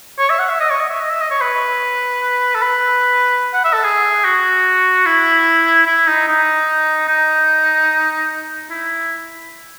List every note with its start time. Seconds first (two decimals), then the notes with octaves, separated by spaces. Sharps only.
0.19 C#5
0.30 E5
0.39 F#5
0.49 E5
0.60 D#5
0.71 C#5
0.80 D#5
0.90 E5
1.01 D#5
1.10 E5
1.21 D#5
1.31 C#5
1.41 B4
2.55 A4
2.62 B4
3.53 F#5
3.64 E5
3.73 A4
3.84 G#4
4.25 F#4
5.06 E4
5.86 E4
6.07 D#4
6.28 D#4
7.08 D#4
8.71 E4